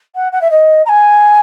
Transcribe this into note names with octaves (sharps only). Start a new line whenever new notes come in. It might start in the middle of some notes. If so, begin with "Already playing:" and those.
F#5
F#5
E5
D#5
A#5
G#5